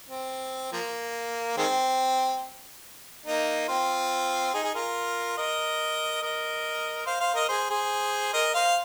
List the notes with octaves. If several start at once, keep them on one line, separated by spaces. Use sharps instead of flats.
C4
F3 A#3
D#3 G#3 C4
A#3 D#4
C4 F4
D#4 G#4
G#4
F4 A#4
A#4 D#5
A#4 D#5
C5 F5
C5 F5
A#4 D#5
G#4 C5
G#4 C5
A#4 D#5
C5 F5